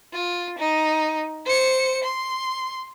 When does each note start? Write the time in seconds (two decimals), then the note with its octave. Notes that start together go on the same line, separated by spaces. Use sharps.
0.13 F4
0.58 D#4
1.45 C5 C#7
2.04 C6